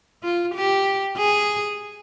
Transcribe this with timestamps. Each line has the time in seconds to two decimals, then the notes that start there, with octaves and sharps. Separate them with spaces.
0.23 F4
0.55 G4
1.17 G#4